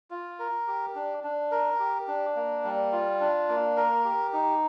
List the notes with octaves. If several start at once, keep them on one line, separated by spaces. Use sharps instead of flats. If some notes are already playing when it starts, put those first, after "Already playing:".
F4
A#4
G4
D4
D4
A#4
G4
D4
A#3
G3
F4
D4
A#3
A#4
G4
D#4